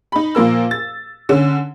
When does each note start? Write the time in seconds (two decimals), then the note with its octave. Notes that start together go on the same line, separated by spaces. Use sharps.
0.12 D#4 B5
0.35 A#2 F3 A#3 A#4 E6
0.71 A6
1.29 D3 C#4